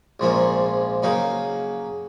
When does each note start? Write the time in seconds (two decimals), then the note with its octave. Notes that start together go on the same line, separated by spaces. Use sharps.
0.20 A#1 G#2 F3 A#3 C#4
1.03 C#3 F#3 A#3 D#4